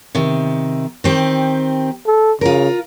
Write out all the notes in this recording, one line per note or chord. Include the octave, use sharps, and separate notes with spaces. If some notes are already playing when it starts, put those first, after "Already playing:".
C3 D#3
D#3 C4 G4
A4
C#3 F4 A#4